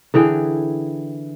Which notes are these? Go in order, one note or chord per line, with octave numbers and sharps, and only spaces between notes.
D3 E3 G#4 G5